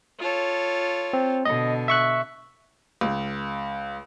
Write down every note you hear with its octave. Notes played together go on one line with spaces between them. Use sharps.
F4 A4 C#5
C4
B2 D3 D#5
E5 C#6 F#6
C#2